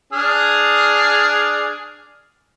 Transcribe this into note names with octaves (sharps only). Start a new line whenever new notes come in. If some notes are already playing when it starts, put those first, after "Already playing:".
D4 G#4 F6